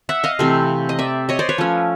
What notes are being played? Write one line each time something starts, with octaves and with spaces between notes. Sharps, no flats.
E5 F#5
D#5 F5
C3 E3 A3 C4
D#5
D5 E5
C#5 D#5
C5 D5
B4 C#5
F3 A3 C#4